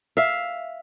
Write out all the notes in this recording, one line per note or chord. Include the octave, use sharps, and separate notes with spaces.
E5 F5